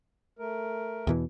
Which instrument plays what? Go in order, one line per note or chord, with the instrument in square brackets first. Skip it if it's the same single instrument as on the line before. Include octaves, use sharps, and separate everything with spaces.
[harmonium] A3 A#4
[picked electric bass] E2 B2 E3